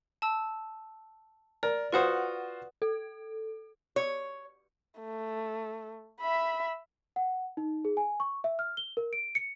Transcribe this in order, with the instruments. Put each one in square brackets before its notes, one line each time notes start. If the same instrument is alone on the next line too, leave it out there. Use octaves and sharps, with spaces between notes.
[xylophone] A5 E6
[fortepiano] A#4 [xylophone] D5
[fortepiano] F4 F#4 C5 [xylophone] B4 F#5 D#6
[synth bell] A4
[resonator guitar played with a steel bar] C#5
[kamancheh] A3
E5 B5
[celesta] F#5
D#4
G#4
G#5
C#6
E5
F6
G7
A#4
D7
C#7